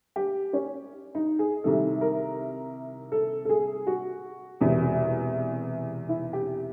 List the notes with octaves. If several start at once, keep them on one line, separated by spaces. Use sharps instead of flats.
G4
C#4
D#4
G#4
C2 C3 D#3 A4
A#4
A4
A4
G#4
F#4
E1 E2 C3
E4
G4